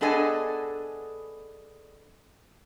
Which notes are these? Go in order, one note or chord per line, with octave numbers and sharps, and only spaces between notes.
B3 D4 G#4 A4 D#5 G#5